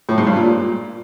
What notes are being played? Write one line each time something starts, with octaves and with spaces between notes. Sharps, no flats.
A2
G#2
G2
A#2